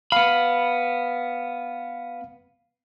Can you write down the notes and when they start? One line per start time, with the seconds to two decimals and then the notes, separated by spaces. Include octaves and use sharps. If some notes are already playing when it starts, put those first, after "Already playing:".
0.12 B3 F5 B5